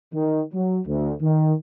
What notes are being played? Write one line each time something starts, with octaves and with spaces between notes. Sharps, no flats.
D#3
F#3
D2
D#3